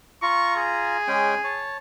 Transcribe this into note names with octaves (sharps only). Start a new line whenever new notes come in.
F4 A#5 C#6
G#4
G#3 C#4 G5
C#5 A5